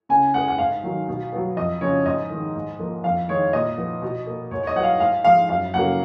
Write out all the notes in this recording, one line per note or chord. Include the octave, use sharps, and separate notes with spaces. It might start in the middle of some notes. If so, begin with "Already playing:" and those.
C#3 G#5
G#3 B3 F#5
F#5
G#2 F5
D#3 F#3
B2
F#3 B3
F2 D#5
C#3 F3 C#5
G#2 D#5
D#3 G#3
G#2
F3 A#3
F2 F5
D#3 G#3 C#5
A#2 D#5
F3 B3
B2
A#3
G#2 C#5
C#5
D#5
F#3 B3 F#5
F5
G#2 F5
F3 G#3 F5
F#2 F5
C#3 F#3 A#3 F#5